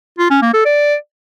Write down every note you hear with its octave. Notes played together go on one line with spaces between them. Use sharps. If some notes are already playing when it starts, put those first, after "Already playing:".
F4
C#4
A#3
A4
D5